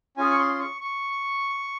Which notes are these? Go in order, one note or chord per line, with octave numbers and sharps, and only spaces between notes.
C#4 F4 G#4 G#5
C#6
C6
C#6
C#6